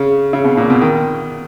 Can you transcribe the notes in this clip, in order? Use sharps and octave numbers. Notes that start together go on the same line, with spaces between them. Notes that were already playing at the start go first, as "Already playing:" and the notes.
Already playing: C#3
C#3
B2
A#2
B2
D#3